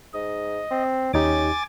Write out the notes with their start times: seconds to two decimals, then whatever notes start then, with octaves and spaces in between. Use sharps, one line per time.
0.14 G#2 D#5
0.71 C4
1.14 D#2 C#4 D#4 G4 G#5 D6 A6